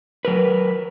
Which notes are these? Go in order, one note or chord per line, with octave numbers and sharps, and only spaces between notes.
F#3 A#4 B4